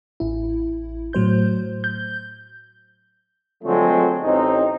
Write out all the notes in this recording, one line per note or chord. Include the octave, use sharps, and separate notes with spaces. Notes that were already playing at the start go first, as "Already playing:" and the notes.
A1 E4
A2 F#3 C5 G6
G6
D3 F3 F#3 G#3 A3 C4
A1 C4 D#4